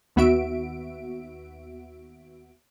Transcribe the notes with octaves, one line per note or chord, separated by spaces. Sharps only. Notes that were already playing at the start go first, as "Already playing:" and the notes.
D#2 B3 F#4 E5 D7